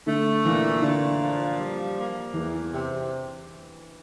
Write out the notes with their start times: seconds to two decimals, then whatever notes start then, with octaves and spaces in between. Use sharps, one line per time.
0.07 D3 A3
0.45 A#2 E3
0.82 A#2 D3
1.21 F3
1.58 G3
1.96 A#3
2.34 E2 E3
2.72 C3